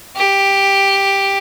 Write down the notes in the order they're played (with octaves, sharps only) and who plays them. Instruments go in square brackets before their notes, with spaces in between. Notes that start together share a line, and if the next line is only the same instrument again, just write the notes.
[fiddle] G4